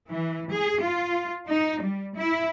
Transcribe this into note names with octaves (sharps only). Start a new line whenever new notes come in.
E3
G#4
F4
D#4
G3
E4